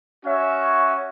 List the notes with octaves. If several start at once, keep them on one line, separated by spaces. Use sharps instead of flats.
C#4 F#4 C#5 E5